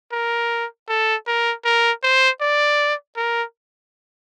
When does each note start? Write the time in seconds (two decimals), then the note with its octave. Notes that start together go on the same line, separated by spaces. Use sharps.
0.12 A#4
0.89 A4
1.27 A#4
1.65 A#4
2.03 C5
2.41 D5
3.17 A#4